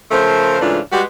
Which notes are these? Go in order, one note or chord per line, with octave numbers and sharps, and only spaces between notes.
C#3 F3 A3 A#4 C5
G#2 C#3 E3 A3 D4 F4
G3 G#3 F#4 G4 B4